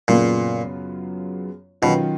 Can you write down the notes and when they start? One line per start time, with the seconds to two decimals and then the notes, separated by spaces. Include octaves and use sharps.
0.08 F#2 A#2 C#3 F#3 B3 F4
1.82 B2 D#3 F#3 C#4 F4